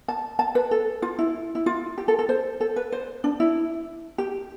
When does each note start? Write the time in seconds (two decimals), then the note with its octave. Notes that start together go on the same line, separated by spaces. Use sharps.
0.08 A5
0.39 A5
0.55 B4
0.71 A4
1.02 F4
1.19 E4
1.55 E4
1.66 F4
1.98 G4
2.08 A4
2.19 A4
2.29 C5
2.61 A4
2.76 B4
2.92 C5
3.24 D4
3.40 E4
4.18 G4